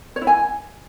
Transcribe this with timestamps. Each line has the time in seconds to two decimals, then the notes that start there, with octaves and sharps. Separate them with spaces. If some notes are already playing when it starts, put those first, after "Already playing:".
0.16 C#5
0.22 E4
0.27 G#5